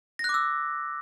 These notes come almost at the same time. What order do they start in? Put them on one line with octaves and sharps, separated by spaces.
A#6 F#6 D6 E6